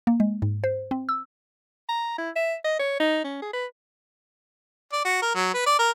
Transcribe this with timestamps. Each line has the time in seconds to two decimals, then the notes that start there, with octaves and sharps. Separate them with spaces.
0.07 A#3
0.20 G#3
0.42 G#2
0.64 C5
0.91 C4
1.09 E6
1.89 A#5
2.18 E4
2.36 E5
2.64 D#5
2.79 C#5
3.00 D#4
3.24 C#4
3.42 G#4
3.53 B4
4.92 D5
5.05 F#4
5.22 A#4
5.35 F#3
5.54 B4
5.66 D5
5.79 A#4